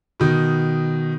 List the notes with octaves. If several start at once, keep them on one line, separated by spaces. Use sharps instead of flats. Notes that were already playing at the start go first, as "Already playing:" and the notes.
B2 D#3